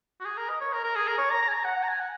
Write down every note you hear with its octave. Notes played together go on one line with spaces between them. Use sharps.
F#4
G#4
A#4
D#5
C#5
A#4
A#4
G#4
A#4
C#5
A#5
A#5
G#5
A#5
F#5
F#5
A#5
G#5
F#5